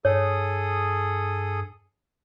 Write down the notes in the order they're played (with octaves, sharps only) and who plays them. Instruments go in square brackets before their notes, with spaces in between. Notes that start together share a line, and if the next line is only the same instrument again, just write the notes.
[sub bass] G2 [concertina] G#4 A4 D#6 [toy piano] C#5